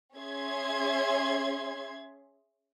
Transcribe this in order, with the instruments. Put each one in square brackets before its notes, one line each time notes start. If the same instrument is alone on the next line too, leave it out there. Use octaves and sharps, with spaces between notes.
[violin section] C#4 G#4 E5 C6 G#6